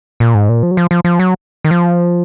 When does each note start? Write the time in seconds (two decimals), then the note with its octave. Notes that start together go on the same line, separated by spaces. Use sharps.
0.20 A#2
0.35 G#2
0.49 A#2
0.63 F3
0.71 F#3
0.77 F3
0.91 F3
1.04 F3
1.19 F#3
1.64 D#3
1.71 F3